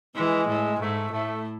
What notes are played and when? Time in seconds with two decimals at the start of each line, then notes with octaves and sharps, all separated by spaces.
0.16 E3 G#3
0.48 A2
0.80 G#2 A3
1.12 A2 A3